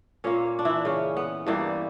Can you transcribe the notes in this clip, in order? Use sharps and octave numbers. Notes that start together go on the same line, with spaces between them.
A#2 A#3 C#4 C#5
D4
E3 E4
C#3 C#4
B3
G2 E3 G3 A#3